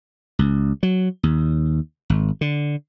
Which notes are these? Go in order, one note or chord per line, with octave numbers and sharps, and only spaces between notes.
C#2
F#3
D#2
G#1
D3